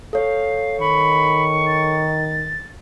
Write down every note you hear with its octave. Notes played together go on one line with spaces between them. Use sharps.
A4 C#5 F5
D#3 B5 C#6
A6